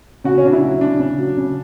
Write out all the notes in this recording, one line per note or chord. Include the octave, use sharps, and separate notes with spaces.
C#3 F#4
C#4
C#3 D4
E4
F#3
C#3 D4
C#3
F#3
C#3